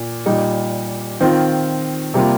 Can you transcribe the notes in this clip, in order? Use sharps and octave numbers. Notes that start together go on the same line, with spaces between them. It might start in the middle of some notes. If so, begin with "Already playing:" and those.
Already playing: A#2
A#2 G3 D#4
D#3 C4 F4
C3 G3 A#3 F4